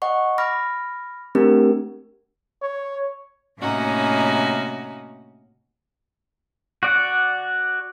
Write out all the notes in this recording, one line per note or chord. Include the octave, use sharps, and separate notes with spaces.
D#5 F#5 C#6
B5 D6 F6 A#6
A3 C4 D4 G4 A#4
C#5
A2 C3 A#3 C#4 D#4 F#4
F#4 D5 F#5